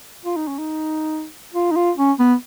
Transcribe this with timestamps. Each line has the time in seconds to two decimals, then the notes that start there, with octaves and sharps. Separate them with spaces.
0.25 F4
0.36 D#4
0.47 C#4
0.58 D#4
1.54 F4
1.71 D#4
1.76 F4
1.97 C#4
2.19 B3